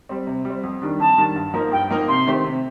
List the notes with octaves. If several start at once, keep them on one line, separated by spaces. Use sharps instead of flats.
G3 C4
C3
G3
C4
F2
D#3 G3 D4
F2 A5
D#3 G3 D4
G2
F3 A#3 D#4 A#4
G2 G5
F3 A#3 D#4 A#4
C3 C6
D#3 A3 C4 G4
C3